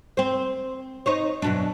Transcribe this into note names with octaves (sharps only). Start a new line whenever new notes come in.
C4 C5
D#4 C5 C#5
F#2 B2 D4